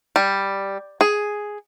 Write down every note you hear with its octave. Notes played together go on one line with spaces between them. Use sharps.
G3
G#4